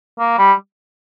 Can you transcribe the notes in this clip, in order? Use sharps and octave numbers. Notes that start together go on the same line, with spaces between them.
A#3
G3